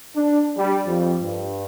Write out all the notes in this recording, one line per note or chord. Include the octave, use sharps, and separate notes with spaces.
D4
G3
F2
G2